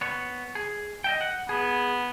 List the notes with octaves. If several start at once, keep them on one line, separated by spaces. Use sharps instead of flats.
B3 C#5
G#4
D#5 E5 G5
F#5
B3 G#4